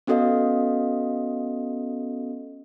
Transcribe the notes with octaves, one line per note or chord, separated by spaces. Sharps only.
B3 C#4 F#4 A4 D#5 F5